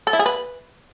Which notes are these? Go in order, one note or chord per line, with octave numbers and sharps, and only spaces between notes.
A4
E4
G#4
B4